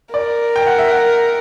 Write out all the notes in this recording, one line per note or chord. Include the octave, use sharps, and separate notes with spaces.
A#4 D5
G5
F#5
E5
F#5